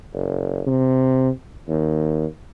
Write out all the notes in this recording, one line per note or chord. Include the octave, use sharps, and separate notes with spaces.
F#1
C3
D#2